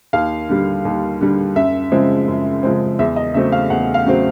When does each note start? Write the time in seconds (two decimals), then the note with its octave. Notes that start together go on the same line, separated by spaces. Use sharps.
0.13 D#2 F5
0.49 D3 G3
0.85 D#2
1.21 D3 G3
1.56 F#2 E5
1.92 C#3 F3 G#3 C4
2.28 F#2
2.63 C#3 F3 G#3 C4
2.99 E2 E5
3.16 D#5
3.34 C#3 F#3 A3 C4 E5
3.52 F5
3.70 E2 F#5
3.94 F5
4.06 C#3 F#3 A3 C4